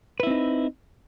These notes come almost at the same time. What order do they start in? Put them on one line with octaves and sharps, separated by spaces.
B4 E4 C4 D#4